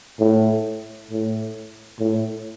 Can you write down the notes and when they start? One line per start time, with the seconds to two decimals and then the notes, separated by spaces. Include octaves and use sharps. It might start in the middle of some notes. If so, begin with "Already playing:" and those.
0.19 A2
1.10 A2
2.00 A2